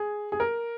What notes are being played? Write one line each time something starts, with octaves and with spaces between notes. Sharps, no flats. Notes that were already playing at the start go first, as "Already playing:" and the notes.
Already playing: G#4
G#4
A#4